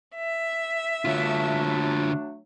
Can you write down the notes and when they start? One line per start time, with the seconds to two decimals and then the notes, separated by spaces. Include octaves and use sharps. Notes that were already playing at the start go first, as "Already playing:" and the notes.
0.16 E5
1.05 D3 F#3 A3 D4 F4